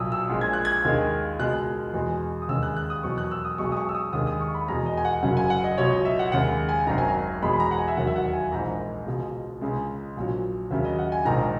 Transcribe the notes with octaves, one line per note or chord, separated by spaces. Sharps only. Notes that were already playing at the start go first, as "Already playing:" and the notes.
Already playing: B1 A#2 F#3 D#6 E6
E6
A#1 A#2 G#3
G#6
F#6
G#6
D#2 D#3 G#3
C#2 B2 G#3 F#6
E2 B2 G#3
D#6
D#2 C#3 G#3 E6
F#6
F#6
D#6
E2 B2 F#3 C#6
F#6
E6
D#6
B1 B2 G#3 C#6
D#6
C#6
E6
D#6
D#2 D#3 G#3 D#6
D#6
C#6
B5
E2 B2 G#3 A#5
D#5
G#5
F#5
F#1 F#2 C#3 F#3 F#5
G#5
F#5
D#5
C#2 B2 F#3 C#5
D#5
E5
F#5
D#2 C#3 G#3 F#5
G#5
G#1 F#2 D#3 A#5
G#5
A#5
E2 B2 G#3 B5
B5
A#5
F#5
G#5
E5
E1 D#2 D#3 F#3 F#5
E5
F#5
G#5
A#1 G#2 E3 A#5
C#2 B2 G#3
C#2 C#3 G#3
A#1 A#2 F#3
D#2 C#3 F#3 E5
D#5
F#5
G#5
A#1 G#2 D#3 A#5